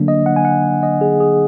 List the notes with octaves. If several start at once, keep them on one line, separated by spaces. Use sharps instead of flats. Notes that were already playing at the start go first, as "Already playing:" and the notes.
Already playing: D3 F#3 A#3 D4
D#5
F#5
G#5
F#5
D#5
G#4
G#4